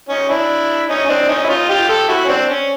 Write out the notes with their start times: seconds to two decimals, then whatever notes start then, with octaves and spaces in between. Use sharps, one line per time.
0.09 C#4 D#4
0.29 D4 E4
0.89 C#4 D#4
1.05 C#4
1.09 C4 D4
1.28 C#4 D#4
1.44 E4
1.49 D#4 F4
1.69 F4 G4
1.89 G4 A4
2.09 E4 F#4
2.25 C#4
2.28 C4 D4
2.49 C#4